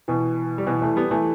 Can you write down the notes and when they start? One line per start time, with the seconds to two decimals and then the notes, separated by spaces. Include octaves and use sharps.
0.08 B2 E3
0.58 G3
0.67 B2 E3
0.82 E3 A3
0.96 G3 B3
1.11 E3 A3